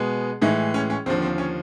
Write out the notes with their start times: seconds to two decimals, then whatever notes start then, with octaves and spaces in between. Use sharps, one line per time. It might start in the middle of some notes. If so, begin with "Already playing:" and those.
Already playing: B2 G#3 B3
0.41 A2 D#3 E3 G#3 D#4
0.74 C#4
0.90 C#4
1.06 D#2 D3 F3 C4
1.22 C4
1.38 C#4